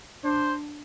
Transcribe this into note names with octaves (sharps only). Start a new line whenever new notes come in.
D4 C5